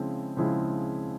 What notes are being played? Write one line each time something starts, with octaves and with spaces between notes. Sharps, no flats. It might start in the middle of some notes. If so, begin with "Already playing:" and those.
Already playing: C#3 F3 G#3 C4 E4
C#3 F3 G#3 C4 E4